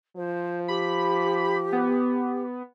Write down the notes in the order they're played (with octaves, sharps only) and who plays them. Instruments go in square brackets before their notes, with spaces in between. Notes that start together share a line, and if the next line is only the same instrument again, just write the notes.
[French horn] F3 [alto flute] C5
[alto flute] G4 [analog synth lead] B5
[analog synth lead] B3